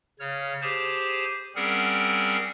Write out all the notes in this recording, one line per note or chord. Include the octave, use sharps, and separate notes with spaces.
C#3 C#5 F6
G4 G#4 C5 G#5 A5
G3 C4 C#4 G#4 A#4 F#5